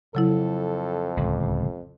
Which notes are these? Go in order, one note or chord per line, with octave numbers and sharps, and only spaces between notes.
F2 C#3 F#3 E4 A4
D1 C#2